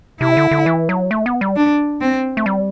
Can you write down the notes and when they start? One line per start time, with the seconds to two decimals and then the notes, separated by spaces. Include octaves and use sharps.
0.21 C3 E4
0.37 D3
0.51 D3
0.66 E3
0.89 F#3
1.11 A3
1.26 B3
1.41 G3
1.56 D4
2.01 C4
2.37 A3
2.46 G3